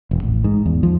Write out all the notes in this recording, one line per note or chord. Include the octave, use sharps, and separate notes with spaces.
E1
A1
G#2
E2
F3